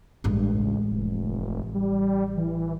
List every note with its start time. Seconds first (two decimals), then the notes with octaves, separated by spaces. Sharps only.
0.24 A1 G2 G#3
0.54 C#2
0.91 F1
1.75 G3
2.37 E3